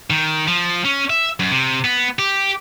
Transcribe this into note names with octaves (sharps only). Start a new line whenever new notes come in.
D#3
F3
C#4
E5
F#2
C3
B3
G4